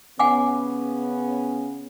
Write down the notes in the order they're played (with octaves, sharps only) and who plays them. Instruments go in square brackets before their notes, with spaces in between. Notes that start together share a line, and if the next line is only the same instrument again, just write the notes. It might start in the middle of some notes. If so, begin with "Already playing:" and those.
[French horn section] C#3 B3 C#4 [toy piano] F#5 G#5 D6